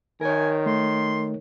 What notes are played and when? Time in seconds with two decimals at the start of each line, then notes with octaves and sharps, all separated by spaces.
0.21 D#3 A#4 C#5 G#5
0.66 A3 C6